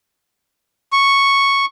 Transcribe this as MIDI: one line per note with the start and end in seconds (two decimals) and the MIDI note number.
0.93 1.66 85